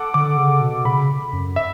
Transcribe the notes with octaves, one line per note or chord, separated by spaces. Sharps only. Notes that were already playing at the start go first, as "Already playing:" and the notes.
Already playing: A4 F#5 D6
D3 D6
C#3
B2
C#3 B5
F#2
E5